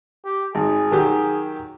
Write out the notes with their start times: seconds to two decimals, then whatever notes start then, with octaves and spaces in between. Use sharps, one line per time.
0.25 G4
0.55 G#1 G#4
0.91 D#3 F#3 G4